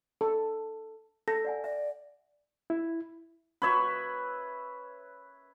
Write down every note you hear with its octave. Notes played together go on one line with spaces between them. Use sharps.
A4
A4 A#6
D5 F#5 G#5
D5 E5
E4
B4 C#5 E5